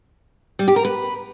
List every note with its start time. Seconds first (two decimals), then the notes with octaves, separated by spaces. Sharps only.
0.59 G3
0.68 G4
0.76 A#4
0.85 B4